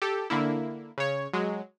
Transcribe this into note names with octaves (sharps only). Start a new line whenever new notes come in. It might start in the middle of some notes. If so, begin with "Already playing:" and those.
G4 A4
D3 A#3 E4
C#3 C#5
F#3 G#3